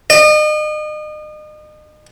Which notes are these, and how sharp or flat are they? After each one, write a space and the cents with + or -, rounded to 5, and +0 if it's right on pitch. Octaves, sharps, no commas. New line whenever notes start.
D#5 -35